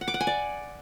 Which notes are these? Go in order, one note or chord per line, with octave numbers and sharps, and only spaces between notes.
F#5
D6
F#5
G#5
D5